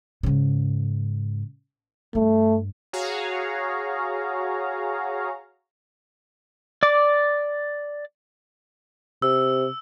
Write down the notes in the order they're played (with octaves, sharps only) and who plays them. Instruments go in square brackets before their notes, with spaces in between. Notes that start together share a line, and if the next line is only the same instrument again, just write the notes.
[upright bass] G#2 C#3
[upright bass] G2 [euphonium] A3
[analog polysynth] F#4 G#4 C#5 F5 A#5
[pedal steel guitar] D5 D6
[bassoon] C3 [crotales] E6